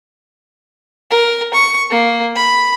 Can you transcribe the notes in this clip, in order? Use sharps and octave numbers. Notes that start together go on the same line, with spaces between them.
A#4
C#6
A#3
B5